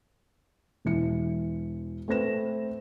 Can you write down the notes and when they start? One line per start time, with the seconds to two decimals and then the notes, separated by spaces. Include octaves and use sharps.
0.85 E1 E3 C#7
2.08 A3 C4 B4 A#6 E7